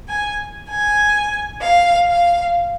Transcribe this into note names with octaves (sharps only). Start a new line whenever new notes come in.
G#5
G#5
F5
F5